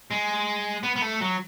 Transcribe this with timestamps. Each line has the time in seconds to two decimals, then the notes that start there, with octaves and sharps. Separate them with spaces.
0.11 G#3
0.83 B3
0.96 B3
1.02 A3
1.21 F#3